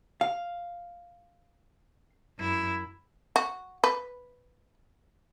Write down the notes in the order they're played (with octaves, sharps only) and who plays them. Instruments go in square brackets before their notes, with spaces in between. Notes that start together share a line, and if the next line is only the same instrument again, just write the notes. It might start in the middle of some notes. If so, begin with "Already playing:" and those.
[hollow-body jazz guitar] F5
[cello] F#2 E4
[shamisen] F#4
B4